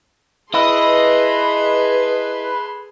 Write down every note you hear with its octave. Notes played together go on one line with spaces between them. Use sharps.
E4 G#4 A4 B4 D#5 C6